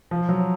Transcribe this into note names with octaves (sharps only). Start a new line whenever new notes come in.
F3
F#3